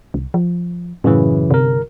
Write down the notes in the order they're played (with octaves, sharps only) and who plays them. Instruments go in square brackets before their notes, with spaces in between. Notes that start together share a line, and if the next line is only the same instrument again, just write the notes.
[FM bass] C2
F3
[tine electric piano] F#2 C#3 E3 [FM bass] A2
[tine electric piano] G1 A#4 [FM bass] C3